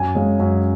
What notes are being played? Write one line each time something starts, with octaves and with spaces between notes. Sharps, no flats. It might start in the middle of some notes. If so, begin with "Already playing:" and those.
Already playing: F#2 G#5
C#3 G#3
F#2